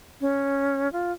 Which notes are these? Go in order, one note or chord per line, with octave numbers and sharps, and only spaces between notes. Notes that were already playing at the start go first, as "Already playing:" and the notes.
C#4
F4